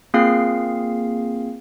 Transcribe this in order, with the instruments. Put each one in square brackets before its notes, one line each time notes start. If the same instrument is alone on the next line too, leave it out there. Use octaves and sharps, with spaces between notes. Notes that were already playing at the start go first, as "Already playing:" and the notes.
[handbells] A#3 C4 F4 G#4 F5 C7